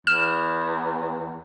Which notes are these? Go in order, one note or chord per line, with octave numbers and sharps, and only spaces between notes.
E2 F6 E7